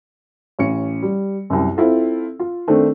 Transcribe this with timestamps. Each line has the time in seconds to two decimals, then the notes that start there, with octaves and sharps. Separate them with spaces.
0.59 A1 C#4 C#7
1.02 G3
1.50 C2 F#2
1.77 C4 E4 F4 A4
2.40 F4
2.68 D#3 A3 C4 D4